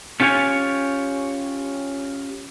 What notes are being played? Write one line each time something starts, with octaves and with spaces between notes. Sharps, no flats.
A3 C#4 F4 G4 C#5 G#5